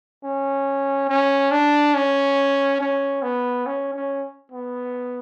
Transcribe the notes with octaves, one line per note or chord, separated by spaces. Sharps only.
C#4
C#4
D4
C#4
C#4
B3
C#4
C#4
B3